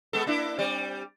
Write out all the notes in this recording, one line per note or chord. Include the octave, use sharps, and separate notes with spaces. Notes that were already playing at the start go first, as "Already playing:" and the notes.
G#3 B3 A4
A#3 D4 E4
G3 C4 D5